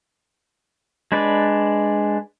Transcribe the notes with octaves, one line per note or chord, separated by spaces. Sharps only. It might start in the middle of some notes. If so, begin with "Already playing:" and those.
G#3 D4 B4 D5